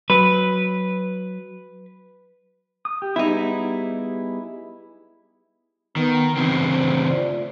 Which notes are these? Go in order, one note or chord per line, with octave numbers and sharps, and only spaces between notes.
F#3 B4
D#6
G4
G3 B3 D#4 E4 G#4
D#3 B3
G2 C#3 E3 C4 C5
A2 F4 D5